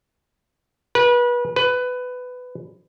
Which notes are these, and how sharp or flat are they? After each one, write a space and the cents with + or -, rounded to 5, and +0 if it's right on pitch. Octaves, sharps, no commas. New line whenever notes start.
B4 -30
B4 +15